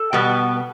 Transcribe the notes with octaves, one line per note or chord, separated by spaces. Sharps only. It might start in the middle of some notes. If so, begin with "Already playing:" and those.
Already playing: A4
B2 G3 B3